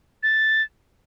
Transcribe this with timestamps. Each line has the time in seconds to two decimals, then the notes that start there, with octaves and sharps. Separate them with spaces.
0.23 A6